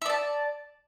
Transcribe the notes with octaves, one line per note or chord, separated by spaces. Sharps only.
D5 E5 A5